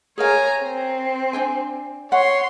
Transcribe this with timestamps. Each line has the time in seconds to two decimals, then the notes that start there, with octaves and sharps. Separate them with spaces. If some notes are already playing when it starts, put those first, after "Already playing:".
0.18 G#4 A#4 C#5 F5 G#5 A#5
0.62 C4
1.33 D4 G5 G#5
2.12 C#5 F#5 C6